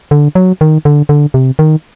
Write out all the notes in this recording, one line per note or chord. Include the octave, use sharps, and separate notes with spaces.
D3
F#3
D#3
D3
D3
C3
D#3